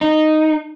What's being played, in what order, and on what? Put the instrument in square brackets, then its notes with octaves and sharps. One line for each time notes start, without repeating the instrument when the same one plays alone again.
[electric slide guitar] D#4